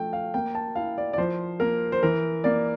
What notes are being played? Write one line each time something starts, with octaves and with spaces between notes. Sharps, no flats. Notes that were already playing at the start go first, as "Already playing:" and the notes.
Already playing: F3 A3 G5
F5
A#3 G5
A5
E4 F5
D5
D5
F3 C5
A#3 A#4
C5
E3 A#4
A#3 D5